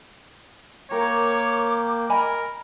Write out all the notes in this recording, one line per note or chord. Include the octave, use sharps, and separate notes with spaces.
A#3 A#4 C#5 G5 D6
A#4 D#5 G#5 B5